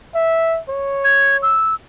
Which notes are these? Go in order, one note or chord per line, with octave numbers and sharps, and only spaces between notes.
E5
C#5
G#6
E6